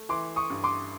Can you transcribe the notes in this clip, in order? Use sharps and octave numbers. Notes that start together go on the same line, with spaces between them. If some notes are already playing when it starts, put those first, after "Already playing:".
Already playing: A3
E3 C6 D6
C#6 D#6
G2
C6 D6